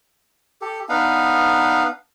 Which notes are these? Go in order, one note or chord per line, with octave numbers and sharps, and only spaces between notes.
G4 A4
B3 D4 D#4 F5